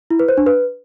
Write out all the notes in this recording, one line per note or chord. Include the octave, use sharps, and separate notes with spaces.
E4
B4
C5
D4
B4